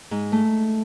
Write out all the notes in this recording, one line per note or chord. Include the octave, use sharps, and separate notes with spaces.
G#2
A3